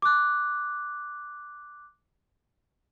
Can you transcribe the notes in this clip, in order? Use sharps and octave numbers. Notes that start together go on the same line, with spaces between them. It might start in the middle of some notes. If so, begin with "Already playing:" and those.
D6 F#6